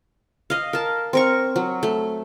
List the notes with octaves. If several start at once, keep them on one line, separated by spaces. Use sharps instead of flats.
D#5 F5
A#4 A5
C4 A#4 C#6
F#3
A3